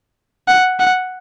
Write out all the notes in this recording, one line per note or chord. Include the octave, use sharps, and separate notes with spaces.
F#5
F#5